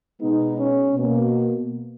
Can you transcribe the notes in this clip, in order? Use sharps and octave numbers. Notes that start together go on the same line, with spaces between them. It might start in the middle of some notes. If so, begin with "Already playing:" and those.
B2 G#3 B3 D#4
C#4
B2 A#3